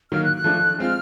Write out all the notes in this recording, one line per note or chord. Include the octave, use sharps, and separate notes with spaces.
D#3 F#3 A#3 F6
F#6
F#6
F3 A3 D4
G#3 C4 F4 F6